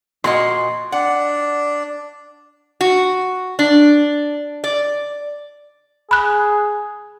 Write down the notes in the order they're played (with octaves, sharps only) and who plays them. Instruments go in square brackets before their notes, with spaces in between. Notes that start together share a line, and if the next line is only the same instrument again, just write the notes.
[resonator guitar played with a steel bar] A#2 F#4 D#5 [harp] C6
[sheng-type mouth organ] D4 [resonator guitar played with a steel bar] F#5
[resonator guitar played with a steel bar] F#4
D4
D5
[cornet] G#4 [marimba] B5 F#6